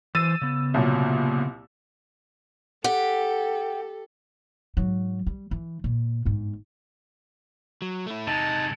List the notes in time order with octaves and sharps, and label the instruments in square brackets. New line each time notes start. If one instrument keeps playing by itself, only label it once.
[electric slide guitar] E3 C5 [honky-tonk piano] E6 A6 D#7
[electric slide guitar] C#3 B3
[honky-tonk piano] C2 A#2 F#3
[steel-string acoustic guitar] G4 [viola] A4 [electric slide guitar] F#5
[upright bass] G#2 F#3
G3
E3
A#2
G1 G#2
[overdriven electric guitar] F#3
A3 E4
[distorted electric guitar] C3 G#3 [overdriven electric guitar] D#4 [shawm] A5